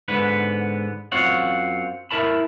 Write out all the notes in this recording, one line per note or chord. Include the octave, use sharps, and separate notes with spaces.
G#2 D3 B3 B4
F#2 C4 F4 C#5 F#5
E4 A#4 A5 B5